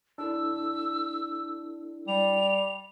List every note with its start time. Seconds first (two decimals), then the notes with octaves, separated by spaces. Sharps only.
0.18 D4 E4 A4 E6
2.08 G3 F7